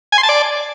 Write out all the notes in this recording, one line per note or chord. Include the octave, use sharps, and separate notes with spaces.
G#5
C6
A5
D5